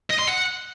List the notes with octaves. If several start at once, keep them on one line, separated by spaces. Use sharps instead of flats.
D#5
C6
F#5